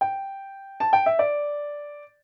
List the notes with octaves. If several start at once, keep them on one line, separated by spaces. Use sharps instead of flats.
G5
A5
G5
E5
D5